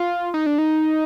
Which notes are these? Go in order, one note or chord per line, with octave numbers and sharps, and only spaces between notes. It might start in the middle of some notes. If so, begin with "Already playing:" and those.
Already playing: F4
D#4
D4
D#4